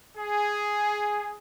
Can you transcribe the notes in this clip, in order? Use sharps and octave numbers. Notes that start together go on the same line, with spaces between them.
G#4